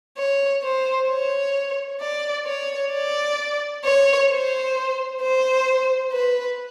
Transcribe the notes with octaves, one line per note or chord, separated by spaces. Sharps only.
C#5
C5
C#5
D5
C#5
D5
C#5
C5
C5
B4